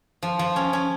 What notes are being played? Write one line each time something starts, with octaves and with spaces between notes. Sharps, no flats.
F3
F3
C#4
C#4